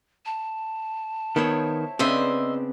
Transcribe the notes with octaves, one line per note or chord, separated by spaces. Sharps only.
A5
D#3 B3 E4 C5 C#5
C#3 B3 C4 D4 C5 D#5 E5